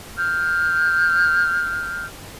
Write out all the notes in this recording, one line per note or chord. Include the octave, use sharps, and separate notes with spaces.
F6 G6